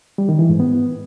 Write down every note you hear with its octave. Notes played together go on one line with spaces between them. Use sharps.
G3
D#3
E3
G#2
B3